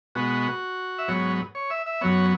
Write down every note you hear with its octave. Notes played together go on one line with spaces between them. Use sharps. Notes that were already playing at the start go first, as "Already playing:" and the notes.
B2 G#3 B3 F#4
E5
G#2 F#3 B3 C#5
C#5
E5
E5
F#2 F#3 B3 C#5